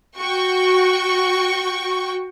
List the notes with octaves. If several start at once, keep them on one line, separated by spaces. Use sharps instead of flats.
F#4 G5 C#6